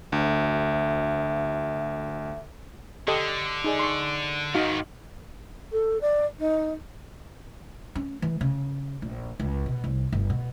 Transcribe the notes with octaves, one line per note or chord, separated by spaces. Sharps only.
D2 E5
D3 G4 A4 D#5
D#4 G#4 D5
C6 C#6
G#2 D#3 D#4 F#4 F5
A4
D5
D#4
C#4
E3
C#3
A#1
C#2
B2
C2
G1
B2